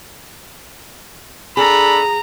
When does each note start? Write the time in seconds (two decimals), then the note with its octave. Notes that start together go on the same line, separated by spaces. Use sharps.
1.57 D4 G#4 A4 A#5 B5